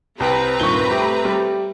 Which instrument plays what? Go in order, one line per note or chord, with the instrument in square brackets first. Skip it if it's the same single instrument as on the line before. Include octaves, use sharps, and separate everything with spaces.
[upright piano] C2 G5 [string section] C4 B4 A#5
[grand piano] D#1 G2 D#3 [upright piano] C#6 G7
[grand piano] A3 [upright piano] G4
[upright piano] G3